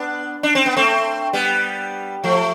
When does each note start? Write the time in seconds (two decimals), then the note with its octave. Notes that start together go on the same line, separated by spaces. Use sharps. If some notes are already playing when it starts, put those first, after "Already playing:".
Already playing: B3 D4
0.43 D4
0.55 C4
0.66 B3
0.77 A3 C4
1.33 G3 B3
2.24 F3 A3